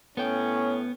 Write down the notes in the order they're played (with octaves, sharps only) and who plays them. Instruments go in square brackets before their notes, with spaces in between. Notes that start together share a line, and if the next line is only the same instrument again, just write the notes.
[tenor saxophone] A2 [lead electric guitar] B3 G5 [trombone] C#4